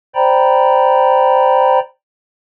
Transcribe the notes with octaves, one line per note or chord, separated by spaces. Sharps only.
C5 D5 G5 A#5 B5